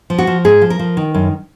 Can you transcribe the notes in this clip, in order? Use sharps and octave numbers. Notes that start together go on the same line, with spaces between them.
F3
F#4
F3
G#2 G#4
F3
A#4
F3
D#3
F#2